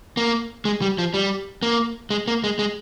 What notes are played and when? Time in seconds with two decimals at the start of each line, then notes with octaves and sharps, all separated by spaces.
0.17 A#3
0.65 G#3
0.82 G3
0.98 F3
1.14 G3
1.62 A#3
2.10 G#3
2.28 A#3
2.44 G#3
2.59 G#3